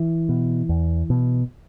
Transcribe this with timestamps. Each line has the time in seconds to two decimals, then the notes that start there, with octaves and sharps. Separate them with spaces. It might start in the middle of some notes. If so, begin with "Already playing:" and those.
Already playing: E3
0.29 B2
0.69 E2
1.10 B2